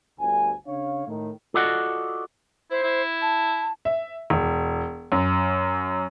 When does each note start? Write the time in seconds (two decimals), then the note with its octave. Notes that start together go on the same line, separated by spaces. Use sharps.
0.19 G1 D2 G#5
0.67 C#3 D4 C#5 F5
1.08 A2 D#3
1.54 F4 F#4 A4 D5 D#5 F#5
2.71 E4 C5
2.83 E4
3.22 A5
3.85 E5
4.30 E1
5.12 F#2